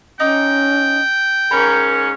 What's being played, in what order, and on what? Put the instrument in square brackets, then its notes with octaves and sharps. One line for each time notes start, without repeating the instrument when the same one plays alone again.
[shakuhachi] C#4 [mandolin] D#4 D6 [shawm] G5
[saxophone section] G#2 C#4 [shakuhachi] A#4 [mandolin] A#5 B5